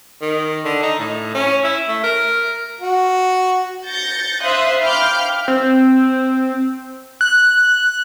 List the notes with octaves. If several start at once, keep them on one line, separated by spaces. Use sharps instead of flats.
D#3
D3
D#4
A2
C#4
E4
A3
A#4
F#4
G6 A6 A#6 C#7
C5 E5 F5 C6 D#6 F#6
F5 G5 B5 D6 F6 G6
C4
F#6